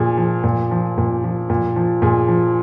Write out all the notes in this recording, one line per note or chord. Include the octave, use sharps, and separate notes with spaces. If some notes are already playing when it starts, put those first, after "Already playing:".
Already playing: A#2 F3 G#4
F3
A#2
F3
A#2
F3
A#2
F3
A#2 G#4
F3